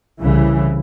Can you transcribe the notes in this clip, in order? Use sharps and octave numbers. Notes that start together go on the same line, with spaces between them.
C2 C#3 E3